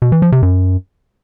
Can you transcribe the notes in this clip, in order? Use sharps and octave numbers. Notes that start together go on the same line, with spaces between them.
B2
E3
F3
C3
F#2